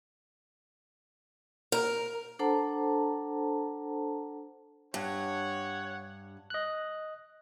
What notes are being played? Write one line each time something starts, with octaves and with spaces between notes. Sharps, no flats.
A#4
D4 A4 C5 F#5 A5 A#5
G2 C#5 F#5
D#5 F#6